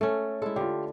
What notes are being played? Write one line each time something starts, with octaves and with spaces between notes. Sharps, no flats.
A3 C#4 A4
G#3 E4 A4
D3 F4 G4